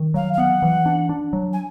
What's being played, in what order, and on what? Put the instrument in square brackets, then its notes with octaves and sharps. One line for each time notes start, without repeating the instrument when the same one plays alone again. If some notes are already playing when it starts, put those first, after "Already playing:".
Already playing: [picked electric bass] D#3
[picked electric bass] F#3 [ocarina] F5
[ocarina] F5
[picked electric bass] B3 [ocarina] F#5
[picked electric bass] E3
D4
D4
F#3
[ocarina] G#5